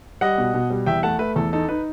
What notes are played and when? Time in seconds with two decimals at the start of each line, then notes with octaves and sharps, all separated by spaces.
0.21 G3 D#5 F#5
0.38 B2
0.54 B2
0.70 G3
0.86 E2 E5 G5
1.03 A3 F#5 A5
1.19 A3 B4
1.36 E2 A4
1.53 D#4 A4
1.69 D#4 B4